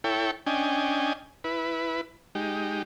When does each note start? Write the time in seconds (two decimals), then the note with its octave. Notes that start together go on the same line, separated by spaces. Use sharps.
0.04 E4 A4 C#5 G5
0.47 C#4 D4 D#5 G5 G#5
1.44 E4 B4
2.35 G#3 D#4 G4